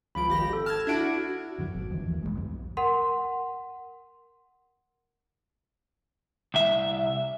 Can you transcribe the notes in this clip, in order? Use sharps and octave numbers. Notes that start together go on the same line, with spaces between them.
C#2 F3 B5 D7
G#1 G4 A#6
A4
A5 F6 G#6
D4 E4 F#4 G#6 D7
D2 G2 E3 F#3
D#1 G#1 G2 B2
F1 F2 D3 E3
D#2 E3
A#1 E2 G2 G#3
B1 F2 G#2
A#4 F#5 C6
C2 E5